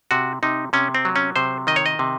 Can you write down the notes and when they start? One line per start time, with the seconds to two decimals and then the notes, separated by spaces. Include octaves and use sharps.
0.11 C3 F#4
0.43 C3 D#4
0.73 C3 C#4
0.95 C4
1.05 F#3
1.16 C#4
1.36 C3 C5
1.67 D#3 D#5
1.76 C#5
1.86 D#5
1.99 C3